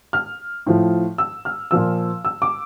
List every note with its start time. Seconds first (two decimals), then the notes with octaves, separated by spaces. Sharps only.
0.13 F6
0.67 A2 F3
1.18 E6
1.45 F6
1.71 A#2 F3 E6
2.25 E6
2.42 D6